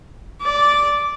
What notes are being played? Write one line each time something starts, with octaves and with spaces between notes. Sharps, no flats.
D5